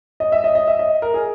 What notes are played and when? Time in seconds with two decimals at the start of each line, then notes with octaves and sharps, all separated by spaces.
0.20 D#5
0.32 E5
0.44 D#5
0.55 D#5
0.67 E5
0.79 D#5
1.02 A#4
1.14 G#4